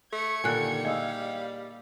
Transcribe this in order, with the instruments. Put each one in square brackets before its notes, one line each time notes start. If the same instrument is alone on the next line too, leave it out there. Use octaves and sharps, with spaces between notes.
[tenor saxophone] A3 [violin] G#6 C#7
[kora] A#2 D3 D#3 [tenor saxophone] G3 [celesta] G#5 F#6
[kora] E4 G#4 [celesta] D#5 [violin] F5